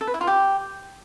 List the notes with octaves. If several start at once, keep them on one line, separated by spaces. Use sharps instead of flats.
A4
B4
E4
F4
G4